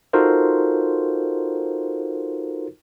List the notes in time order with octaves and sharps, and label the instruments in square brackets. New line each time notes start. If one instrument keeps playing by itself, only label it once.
[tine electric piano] D#4 F4 F#4 A4 A#4 C5